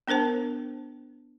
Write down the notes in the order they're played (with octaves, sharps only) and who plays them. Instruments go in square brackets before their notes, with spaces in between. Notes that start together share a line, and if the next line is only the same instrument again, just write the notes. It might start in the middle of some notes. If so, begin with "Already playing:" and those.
[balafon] B3 D4 A#4 C5 A5